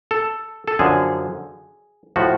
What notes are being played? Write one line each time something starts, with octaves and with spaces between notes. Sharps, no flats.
A4
A4
F#2 D3 F3 G#4
A2 F3 F#4